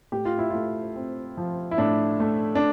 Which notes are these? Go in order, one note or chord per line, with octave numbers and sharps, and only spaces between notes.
A2 G4
F4
E4
A3 F4
C4
F3
E4
A2 D4
A3
D4